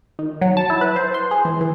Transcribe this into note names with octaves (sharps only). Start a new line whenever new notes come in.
D#3
F#3
A5
E4
B4
C5
C6
G#4
E3
E3